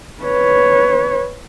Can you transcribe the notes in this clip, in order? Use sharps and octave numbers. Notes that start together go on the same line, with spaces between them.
B4 C#5